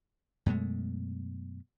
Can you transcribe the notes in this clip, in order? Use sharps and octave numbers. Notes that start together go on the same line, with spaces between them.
F#2 B2 G#3 A3